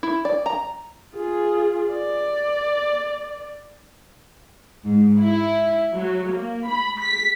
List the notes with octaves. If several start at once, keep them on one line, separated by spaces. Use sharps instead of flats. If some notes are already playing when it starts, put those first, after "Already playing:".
E4
D5
A#5
F4 G#4
D5
G#2
E4
F#3
A#3
B5
B6